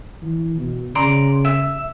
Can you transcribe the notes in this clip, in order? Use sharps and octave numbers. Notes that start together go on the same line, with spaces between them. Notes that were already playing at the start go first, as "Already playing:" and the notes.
E3
B2
C#3 D5 A#5 C6
E5